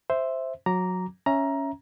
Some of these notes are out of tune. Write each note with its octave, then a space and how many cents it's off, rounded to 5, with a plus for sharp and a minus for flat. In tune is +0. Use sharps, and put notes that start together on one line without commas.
C5 +0 E5 +0
F#3 -15 A#5 +0 D6 -15
C#4 +0 E5 +0 A#5 +15